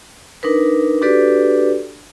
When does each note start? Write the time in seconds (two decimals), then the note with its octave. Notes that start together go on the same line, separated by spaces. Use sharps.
0.43 D4 D#4 A#4 B4
1.02 D4 F#4 G4 A4 B4 D5